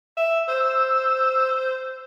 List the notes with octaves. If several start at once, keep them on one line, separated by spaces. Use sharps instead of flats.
E5
C5 E6